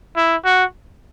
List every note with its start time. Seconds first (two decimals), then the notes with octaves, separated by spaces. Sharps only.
0.16 E4
0.45 F#4